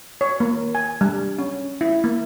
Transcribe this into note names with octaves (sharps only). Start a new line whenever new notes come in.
C#5
A#3
G#5
G3
C#4
E4
A#3